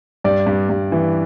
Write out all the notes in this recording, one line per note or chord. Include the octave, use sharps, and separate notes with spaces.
G2 D5
G2
G2
E3